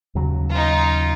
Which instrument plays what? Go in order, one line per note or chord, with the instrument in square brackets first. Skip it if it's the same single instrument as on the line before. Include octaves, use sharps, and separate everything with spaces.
[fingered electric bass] D#2 C#3 F#3
[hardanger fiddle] D#4 F4